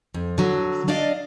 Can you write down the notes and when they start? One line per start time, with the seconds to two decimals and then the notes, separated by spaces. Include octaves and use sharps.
0.14 F2
0.38 D3 F#3
0.88 D4 D5 D#5 F5